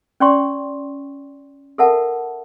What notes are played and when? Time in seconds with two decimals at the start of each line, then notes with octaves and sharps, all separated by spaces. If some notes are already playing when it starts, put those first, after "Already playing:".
0.20 C#4 D5 G5 C6 C#6
1.78 A4 A#4 E5 F#5 A5